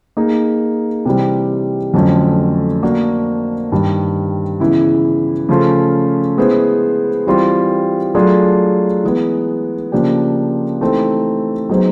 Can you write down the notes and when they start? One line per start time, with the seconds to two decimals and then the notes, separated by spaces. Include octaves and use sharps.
0.17 A#3 D#4 G#4
1.05 C3 E3 G3
1.94 F2 D3 F#3 A3 C#4
2.83 A#3 D4 F#4
3.72 G2 D#3 G3
4.60 C#3 E3 G#3 B3 E4
5.49 C#3 F3 A3 C#4 F4
6.38 G#3 B3 E4 G#4 C5
7.27 E3 G3 C4 F4
8.15 F#3 A3 D4 F4 G#4
9.04 E3 G#3 B3
9.92 C#3 F3 A#3 D4 G4
10.81 E3 A3 C4 D#4 G4
11.69 F#3 B3 D#4 G#4 C5